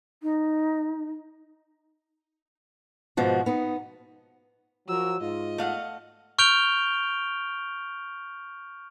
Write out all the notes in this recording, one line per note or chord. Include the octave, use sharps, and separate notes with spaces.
D#4
G#2 B2 F3 F#4
B3 D#4
F3 F#3 A#4 E6
G#2 F4 D#5
A3 F5 F#5
C#6 F6 G6 D7 F7 G7